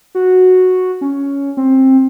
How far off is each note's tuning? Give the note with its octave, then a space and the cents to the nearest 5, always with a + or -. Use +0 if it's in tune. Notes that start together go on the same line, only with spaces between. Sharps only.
F#4 -5
C#4 +10
C4 +15